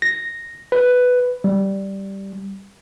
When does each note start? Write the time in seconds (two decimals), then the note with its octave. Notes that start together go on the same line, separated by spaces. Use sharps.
0.02 A#6
0.72 B4
1.44 G3